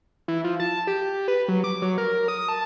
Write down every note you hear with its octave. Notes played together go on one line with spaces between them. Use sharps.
E3
F3
A5
G4
B4
F#3
D6
F#3
A#4
D#6
A5